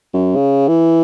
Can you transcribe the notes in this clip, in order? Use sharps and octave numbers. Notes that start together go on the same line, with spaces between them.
F#2
C#3
E3